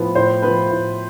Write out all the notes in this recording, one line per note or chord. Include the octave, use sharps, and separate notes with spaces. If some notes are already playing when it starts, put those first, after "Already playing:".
Already playing: A2 F3 B3
A2 C5
F3 B3 B4
A2